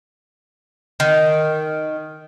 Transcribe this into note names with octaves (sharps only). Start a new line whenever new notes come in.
D#3